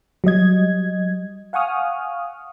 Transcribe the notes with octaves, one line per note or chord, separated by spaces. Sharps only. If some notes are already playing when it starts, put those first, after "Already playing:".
F#3 G3 D#5 G#6
F5 F#5 G#5 C#6 D#6 F6